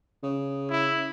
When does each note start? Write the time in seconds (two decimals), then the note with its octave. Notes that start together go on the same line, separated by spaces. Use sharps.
0.23 C#3
0.71 E4